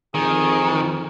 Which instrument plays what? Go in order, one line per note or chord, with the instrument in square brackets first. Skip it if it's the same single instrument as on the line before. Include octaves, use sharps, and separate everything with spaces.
[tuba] F2 [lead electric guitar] D#3 [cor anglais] G#4